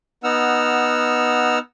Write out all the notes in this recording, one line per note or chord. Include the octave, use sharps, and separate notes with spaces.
B3 D#4 F#5 E6 F6